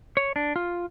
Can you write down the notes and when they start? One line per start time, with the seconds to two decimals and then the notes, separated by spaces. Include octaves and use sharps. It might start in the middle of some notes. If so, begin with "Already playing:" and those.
0.17 C#5
0.36 D4
0.56 F4